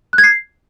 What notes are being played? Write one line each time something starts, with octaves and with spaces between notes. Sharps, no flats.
F#6
G#6
C7